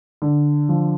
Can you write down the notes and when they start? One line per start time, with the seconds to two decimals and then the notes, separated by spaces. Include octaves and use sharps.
0.22 D3
0.69 F3